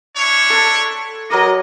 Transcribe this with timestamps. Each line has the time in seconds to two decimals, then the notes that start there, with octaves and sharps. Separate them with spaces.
0.17 D4 E4 C#5
0.50 A4 F#5 C6
1.30 F#3 G#3 A#4 D#5 D6